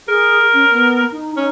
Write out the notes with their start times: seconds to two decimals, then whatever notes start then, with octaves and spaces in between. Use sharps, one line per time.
0.08 G#4 A#4
0.54 C#4
0.70 B3
1.12 D#4
1.36 C#4 D#4